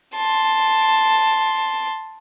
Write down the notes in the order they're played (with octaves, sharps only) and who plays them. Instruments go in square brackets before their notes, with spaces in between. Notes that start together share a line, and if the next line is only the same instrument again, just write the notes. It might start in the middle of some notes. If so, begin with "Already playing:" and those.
[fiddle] A5 C6